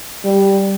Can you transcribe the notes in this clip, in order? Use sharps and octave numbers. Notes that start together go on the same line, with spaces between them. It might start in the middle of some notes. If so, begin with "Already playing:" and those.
G3